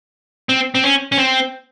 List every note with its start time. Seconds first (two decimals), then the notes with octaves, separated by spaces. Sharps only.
0.49 C4
0.75 C4
0.84 C#4
1.12 C#4
1.18 C4